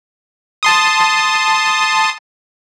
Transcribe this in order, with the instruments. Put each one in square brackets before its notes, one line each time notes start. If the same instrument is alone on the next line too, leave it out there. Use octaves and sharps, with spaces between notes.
[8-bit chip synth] A5 C6 D#6